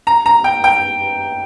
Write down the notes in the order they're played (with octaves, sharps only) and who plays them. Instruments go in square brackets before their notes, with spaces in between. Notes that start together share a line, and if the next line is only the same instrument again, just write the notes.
[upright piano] A#5
A#5
G5
G5